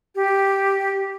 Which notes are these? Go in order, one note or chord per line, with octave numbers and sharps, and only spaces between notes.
G4